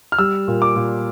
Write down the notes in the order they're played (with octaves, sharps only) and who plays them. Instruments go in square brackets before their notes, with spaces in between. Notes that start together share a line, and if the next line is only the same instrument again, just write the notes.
[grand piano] F6
G3 E6
A#2
D6
A#2